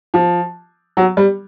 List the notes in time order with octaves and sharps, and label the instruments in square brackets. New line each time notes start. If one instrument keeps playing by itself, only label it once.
[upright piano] F3
F#3
G3